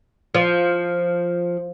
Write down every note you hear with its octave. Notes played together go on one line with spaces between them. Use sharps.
F3